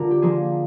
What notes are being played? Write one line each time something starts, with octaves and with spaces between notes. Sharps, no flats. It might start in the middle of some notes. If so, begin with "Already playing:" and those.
Already playing: D3 F4 A#4
G4
F3 A#3 G#4